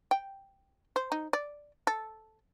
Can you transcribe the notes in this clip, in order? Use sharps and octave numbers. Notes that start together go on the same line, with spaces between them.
G5
C5
D#4
D5
A4